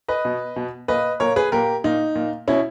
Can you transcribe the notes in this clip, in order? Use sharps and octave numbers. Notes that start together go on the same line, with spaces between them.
B4 D#5
B2
B2
A#2 B4 D#5
A#2 A#4 C#5
G#4 B4
A#2 G4 A#4
A#2 D#4
A#2
B2 C#4 E4